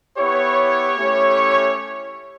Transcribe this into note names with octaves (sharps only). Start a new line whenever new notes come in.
B3 E4 G4 C#5
A3 C#4 E4 G4